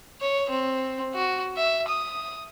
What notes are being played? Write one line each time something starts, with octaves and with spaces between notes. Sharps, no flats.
C#5
C4
F#4
E5
D#6